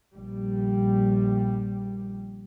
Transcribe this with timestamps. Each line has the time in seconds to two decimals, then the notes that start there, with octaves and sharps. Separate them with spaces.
0.13 A#1 G3